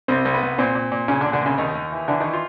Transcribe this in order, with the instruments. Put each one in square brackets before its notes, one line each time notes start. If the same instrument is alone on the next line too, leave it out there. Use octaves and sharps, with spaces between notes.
[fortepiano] C2 C4
C2
B3
C2
A#2 C4
A#2
A#2
A#2 C#3 C#4
D3 D4
A#2
D3 D4
C2 C#3 C#4
D#2 D#3 D#4
D#2
E3
D3 E3 D4
D#3 E3 D#4
F4